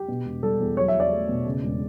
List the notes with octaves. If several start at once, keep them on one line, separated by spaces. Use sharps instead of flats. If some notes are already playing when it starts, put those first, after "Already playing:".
Already playing: G4
B2
E1
G3 A4
E2
F#3 C#5
E5
E2
D5
A3
B2
C#3
E1